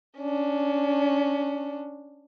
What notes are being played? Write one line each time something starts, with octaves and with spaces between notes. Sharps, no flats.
C#4 D4